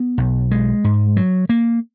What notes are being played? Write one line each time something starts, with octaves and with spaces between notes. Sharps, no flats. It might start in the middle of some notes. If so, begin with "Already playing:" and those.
Already playing: B3
B1
G#3
G#2
F#3
A#3